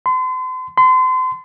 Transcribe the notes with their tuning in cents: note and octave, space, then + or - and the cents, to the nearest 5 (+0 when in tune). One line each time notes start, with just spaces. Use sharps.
C6 -40
C6 -35